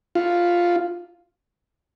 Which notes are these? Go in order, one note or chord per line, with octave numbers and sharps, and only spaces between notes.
F4